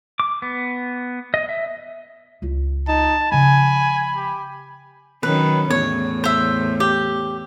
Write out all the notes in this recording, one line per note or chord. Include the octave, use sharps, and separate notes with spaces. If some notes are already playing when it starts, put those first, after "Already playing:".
D6
B3
D#5
E5
C#2 F4
D#4 A5
C#3 F3 G#5 B5
G4
D#3 F#3 C#4 B4
E2 A2 C#5
C5 E5
G4